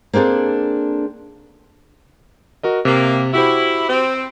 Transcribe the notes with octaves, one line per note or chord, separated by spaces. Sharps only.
A#3 C4 D4 G#4 A4
F#4 A#4 D#5
C3 A#3
E4 F#4 G4 C5
C4